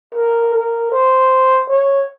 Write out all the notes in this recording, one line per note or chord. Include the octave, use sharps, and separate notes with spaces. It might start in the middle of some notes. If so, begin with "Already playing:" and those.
A#4
A#4
C5
C#5